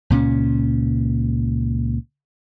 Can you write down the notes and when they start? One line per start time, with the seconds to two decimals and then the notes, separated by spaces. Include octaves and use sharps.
0.10 C#2 A#2 G3 C#4